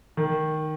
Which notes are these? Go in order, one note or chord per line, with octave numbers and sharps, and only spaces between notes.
D#3